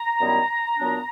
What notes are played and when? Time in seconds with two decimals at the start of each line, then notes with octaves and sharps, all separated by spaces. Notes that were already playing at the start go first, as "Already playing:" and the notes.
Already playing: A#5
0.20 F#2 D#3 G3 B3 E4
0.78 A#2 F#3 B3 D4